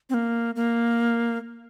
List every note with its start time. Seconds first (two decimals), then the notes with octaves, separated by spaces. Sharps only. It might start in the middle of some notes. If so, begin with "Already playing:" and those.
0.10 C4
0.14 A#3
0.56 A#3